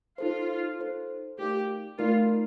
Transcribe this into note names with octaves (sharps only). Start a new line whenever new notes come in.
D#4 F4 A4 C5
D#4 A4 C5
A3 D#4 G4 A#4 D5 F5
A3 D#4 F4 A#4 D5 F5